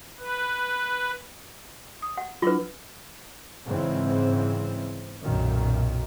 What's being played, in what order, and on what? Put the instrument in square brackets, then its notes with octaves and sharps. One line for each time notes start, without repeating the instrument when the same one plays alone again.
[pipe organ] B4
[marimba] D#6
[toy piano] F#5
[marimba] F#3 D4 E4 [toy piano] F4 B4
[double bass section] G#2 C#3 E3 C4
B1 F#2 A#2 D#3